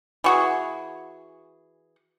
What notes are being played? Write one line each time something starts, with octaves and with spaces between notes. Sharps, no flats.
E3 F#4 G#4